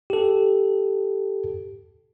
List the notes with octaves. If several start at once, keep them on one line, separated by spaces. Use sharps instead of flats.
G4 A4